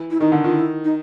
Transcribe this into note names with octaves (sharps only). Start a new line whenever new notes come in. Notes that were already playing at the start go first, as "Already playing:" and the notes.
Already playing: E3
E4
D#3 D#4
D3
D#3 F4
E4
D#4